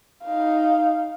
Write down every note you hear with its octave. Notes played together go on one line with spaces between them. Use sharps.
D#4 F5